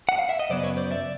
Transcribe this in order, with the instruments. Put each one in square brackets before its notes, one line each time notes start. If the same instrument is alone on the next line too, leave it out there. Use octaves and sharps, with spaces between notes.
[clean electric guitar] F#5
F5
E5
D#5
F#2 C#3 F#3 B3 C5 D5
B4 C#5
C5 D5
D5 E5